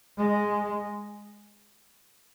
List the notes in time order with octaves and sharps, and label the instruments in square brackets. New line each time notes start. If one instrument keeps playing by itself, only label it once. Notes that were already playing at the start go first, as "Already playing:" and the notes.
[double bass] G#3